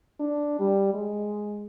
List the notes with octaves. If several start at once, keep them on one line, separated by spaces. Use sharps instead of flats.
D4
G3
G#3